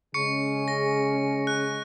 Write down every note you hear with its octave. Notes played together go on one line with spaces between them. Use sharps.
C#3 G#3 C#4 G#4 C#6 C#7
A#6
F#6